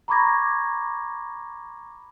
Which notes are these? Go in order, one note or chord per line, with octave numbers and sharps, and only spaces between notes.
A#5 B5 C#6 D6 G#6 A#6